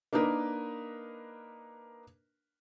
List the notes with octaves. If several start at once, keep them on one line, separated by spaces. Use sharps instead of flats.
A#3 D4 D#4 A#4 B4